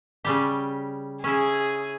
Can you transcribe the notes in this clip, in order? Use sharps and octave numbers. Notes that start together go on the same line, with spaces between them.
C#3 G3 G4
C#4 E4 G#4